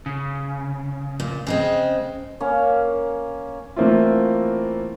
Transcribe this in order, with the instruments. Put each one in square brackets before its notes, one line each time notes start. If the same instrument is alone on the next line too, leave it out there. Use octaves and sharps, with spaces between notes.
[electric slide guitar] C#3
[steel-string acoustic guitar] A#2
C#3 G#3 C4
[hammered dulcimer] A#3 C#4
[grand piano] E3 A3 A#3 C4 E4 F4